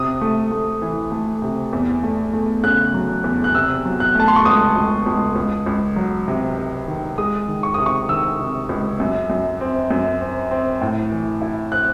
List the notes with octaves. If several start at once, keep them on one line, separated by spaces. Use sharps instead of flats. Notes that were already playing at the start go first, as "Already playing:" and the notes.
Already playing: C3 D#6
A3
A3
E3
A3
C3
E2
A3
A3
C#3 F#6
F#3
E2
F#6
C3 E6
F#3
F#6
A3 A5
C6
C#6
C#2 D#6
C#2
C#2
C#2
C#2
F#3
C3
C3
D#3
G#3 D#6
D#3
C#6
C3 D#6
C#6
D#3 E6
C3
C#2
F#2
F#2
C4
F#2
C4
C4
A2
E3
E4
C4 F#6